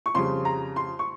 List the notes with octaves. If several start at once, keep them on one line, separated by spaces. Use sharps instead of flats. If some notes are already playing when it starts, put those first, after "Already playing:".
C#6
F2 C#3 G3 C6
A#5
C6
C#6